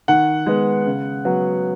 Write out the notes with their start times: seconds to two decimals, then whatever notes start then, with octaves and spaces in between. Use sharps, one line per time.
0.08 D#3 F#5
0.46 G#3 B3
0.86 C#3
1.25 F#3 B3